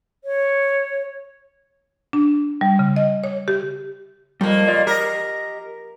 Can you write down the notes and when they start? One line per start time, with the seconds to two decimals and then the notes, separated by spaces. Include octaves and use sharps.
0.24 C#5
2.13 D4
2.61 G3
2.79 C#3
2.96 D#5
3.24 C#5
3.48 G4
4.41 F2 G3 A#3
4.67 F4 D5 D#5
4.87 G4 A#4 D#5